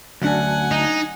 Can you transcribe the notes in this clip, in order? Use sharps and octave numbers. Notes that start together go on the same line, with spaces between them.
D2 F#3 C#4 D4 F#5 G#5
D#4